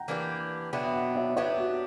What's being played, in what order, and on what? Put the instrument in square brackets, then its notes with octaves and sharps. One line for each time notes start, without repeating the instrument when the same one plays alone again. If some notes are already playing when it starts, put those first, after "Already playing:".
Already playing: [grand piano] F#5 G5 A#5
[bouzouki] E3 A#3 D4 G4
[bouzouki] B2 F#3 B3 D4 [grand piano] E5 G5
[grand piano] E5
D5 F#5
C#5 E5
[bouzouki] F#3 B3 D4 G4 [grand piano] C#5 E5
[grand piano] F#4